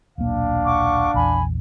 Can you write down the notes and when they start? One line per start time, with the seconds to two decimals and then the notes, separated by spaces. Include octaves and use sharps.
0.18 D#1 B1 A#3 D4 F5
0.64 F#5 C#6 D6
1.14 A#1 E2 G#5 B5